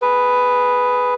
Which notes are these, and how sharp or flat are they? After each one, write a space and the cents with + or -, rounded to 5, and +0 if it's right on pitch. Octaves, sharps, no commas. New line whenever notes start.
G#4 +0 B4 +0